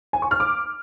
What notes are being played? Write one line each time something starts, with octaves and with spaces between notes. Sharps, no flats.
G#5
C#6
F6
D6